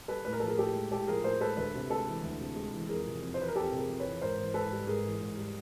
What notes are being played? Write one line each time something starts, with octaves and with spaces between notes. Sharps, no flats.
G3 A4 B4
A2 B4
A#4
F3 A4
G#4 A#4
A2 G4 A4
G#3
A2 G4 A4
F3 G#4 A#4
A2 A#4 C5
G#3 A4 B4
D2 A4 B4
C3
G#3 A4 B4
E3
D2
C3
G#3
E3
F2 G#4 A#4
C3
F2
C5
E3 B4
A#4
F2 G4 A4
C3
G#4 A#4
F2
B4 C#5
E3
G#2 A#4 C5
E3
G#2 A4 B4
G3
G#2 G#4 A#4
E3
G#2
G3